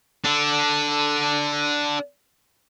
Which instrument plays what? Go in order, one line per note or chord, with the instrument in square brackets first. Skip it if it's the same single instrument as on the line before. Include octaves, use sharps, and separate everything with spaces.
[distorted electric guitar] D4 A4